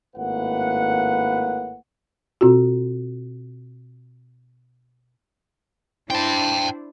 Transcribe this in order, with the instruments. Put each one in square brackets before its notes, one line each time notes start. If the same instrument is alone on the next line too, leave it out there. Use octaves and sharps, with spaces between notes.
[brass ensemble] G#1 A2 A#3 B4 F#5
[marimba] B2 C4 F4 F#4
[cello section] D4 E4 C5 [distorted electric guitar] G5 A5